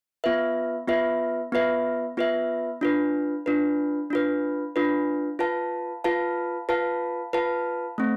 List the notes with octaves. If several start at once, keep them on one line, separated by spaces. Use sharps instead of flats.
B3 F4 B4 E5
B3 F4 B4 E5
B3 F4 B4 E5
B3 F4 B4 E5
D4 F4 B4
D4 F4 B4
D4 F4 B4
D4 F4 B4
F4 B4 F5 A5
F4 B4 F5 A5
F4 B4 F5 A5
F4 B4 F5 A5
A3 C4